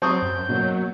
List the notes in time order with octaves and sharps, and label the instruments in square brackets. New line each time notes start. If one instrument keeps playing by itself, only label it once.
[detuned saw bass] F#3 [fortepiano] C4 C#6 D#6 [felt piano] A5 A#5 [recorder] G6
[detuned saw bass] F#2
[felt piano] B2 A#3 C#4 [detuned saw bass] F#3